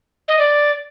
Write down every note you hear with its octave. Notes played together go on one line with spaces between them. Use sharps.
D#5
D5